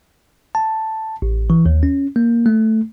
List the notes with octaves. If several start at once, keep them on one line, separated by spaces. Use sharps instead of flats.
A5
A1
E3
D#2
C#4
A#3
A3